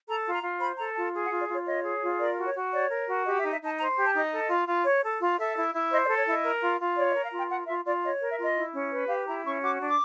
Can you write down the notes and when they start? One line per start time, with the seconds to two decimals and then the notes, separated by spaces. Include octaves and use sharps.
0.07 A4 A#5
0.25 F4
0.34 A#5
0.42 F4
0.60 C5 B5
0.78 A4 A#5
0.95 F4 A5
1.14 G#4
1.26 F#5
1.31 F4
1.40 D5
1.49 F4 C#5
1.66 C#5 D#5
1.85 G#4
2.02 F4
2.20 A#4 D5
2.37 F#4
2.45 C#5
2.55 F#4
2.72 C#5 D5
2.91 A#4
3.08 F#4
3.25 G4 D#5
3.39 E5
3.44 D#4
3.52 E5
3.61 D#4 A5
3.78 C5 A#5
3.96 G4
4.05 A5
4.14 D#4 D#5
4.31 A4
4.49 F4
4.68 F4
4.85 C#5
5.03 A4
5.20 F4
5.38 A4 E5
5.56 E4
5.74 E4
5.91 C5 D#5
6.04 D5
6.09 A4
6.18 C#5
6.27 E4 D#5
6.44 A#4
6.62 F4
6.80 F4
6.97 C#5 D5
7.10 D#5
7.14 A#4
7.24 F5
7.33 F4 G5
7.50 A#4 F#5
7.67 F4 E5
7.85 F4 D5
8.04 C#5 D#5
8.21 A#4
8.30 E5
8.38 F4
8.44 D#5
8.56 E4
8.73 C#4
8.91 B4
9.09 G4 F5
9.27 E4 A#5
9.45 C#4 C#6
9.62 F#4 D6
9.81 D4
9.88 D6